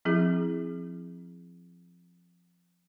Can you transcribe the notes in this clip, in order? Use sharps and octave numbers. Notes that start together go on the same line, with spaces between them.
F3 C4 E4 G#4